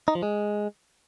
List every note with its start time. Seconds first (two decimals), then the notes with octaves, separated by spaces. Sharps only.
0.08 D#4
0.15 F3
0.23 G#3